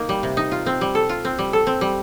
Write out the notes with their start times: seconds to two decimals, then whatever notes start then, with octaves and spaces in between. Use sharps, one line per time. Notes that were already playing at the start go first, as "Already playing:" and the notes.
Already playing: A#3 D#4
0.09 G3
0.23 C3
0.37 D#4
0.51 F4
0.66 C4
0.81 G3
0.95 A4
1.09 F4
1.25 C4
1.39 G3
1.53 A4
1.67 C4
1.81 G3